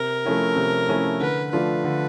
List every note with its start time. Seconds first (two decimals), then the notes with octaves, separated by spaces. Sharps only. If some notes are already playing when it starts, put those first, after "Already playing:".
Already playing: C3 A#4
0.25 F3 A3 C#4 E4
0.56 C3
0.89 F3 A3 C#4 E4
1.20 D3 B4
1.53 F3 A3 D4 F4 B4
1.84 D3